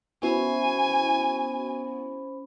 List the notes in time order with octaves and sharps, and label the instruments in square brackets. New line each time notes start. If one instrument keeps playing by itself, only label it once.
[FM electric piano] B3 E4 F#4 [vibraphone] C#4 C5 B5 [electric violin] G#5